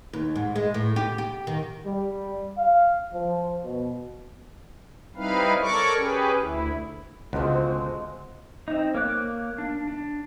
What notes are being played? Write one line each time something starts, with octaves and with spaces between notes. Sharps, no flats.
D#2
G#2
G#3
A2
G4
G4
D#3
G3
F5
F3
B2
G3 C4 D#4 E4 B4 F5
A4 A#4 C#5 D5 C#6 D6
C#4 G4 G#4 B4
D2 E4
C#2 D3 F3 G#3 C4 F#4
C4 D#4
A#3 C#5 D6 F#6
D4
D4